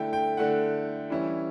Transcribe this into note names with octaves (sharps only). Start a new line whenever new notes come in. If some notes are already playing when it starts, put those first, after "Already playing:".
Already playing: D3 A3 E4 G5
G5
D3 A3 E4 F#5
E3 G3 C#4 E4